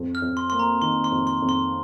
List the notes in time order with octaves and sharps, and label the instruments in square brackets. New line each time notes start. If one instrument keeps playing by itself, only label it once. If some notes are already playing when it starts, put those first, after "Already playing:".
Already playing: [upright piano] F2
[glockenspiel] F6
[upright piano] F2
[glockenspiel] C6
[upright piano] A#3 [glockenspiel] C6
[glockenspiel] A#5
[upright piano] D#3 [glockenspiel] C6
[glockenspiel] C6
[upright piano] F2
[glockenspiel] C6
[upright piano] F2
[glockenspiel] C6